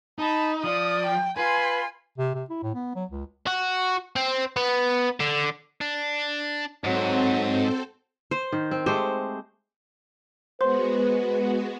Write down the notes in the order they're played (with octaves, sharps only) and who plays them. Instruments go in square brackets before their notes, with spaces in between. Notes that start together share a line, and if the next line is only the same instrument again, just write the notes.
[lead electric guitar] D#4 [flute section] A5 B5
[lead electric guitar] F3 [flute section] D5 [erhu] D#6
[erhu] G5
[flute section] F4 B5 C6 [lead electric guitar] B4 [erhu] G#5
[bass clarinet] C3
C3
E4
A2
B3
F#3
C#2
[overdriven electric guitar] F#4
C4
B3
D3
[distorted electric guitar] D4
[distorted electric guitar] G#2 [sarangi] F#3 [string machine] C4 A4 C5
[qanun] C5
[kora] D#3
C4
[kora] G#3 A3 G4 [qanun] C5
[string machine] G#3 B3 F#4 [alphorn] B4 [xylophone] C5 C6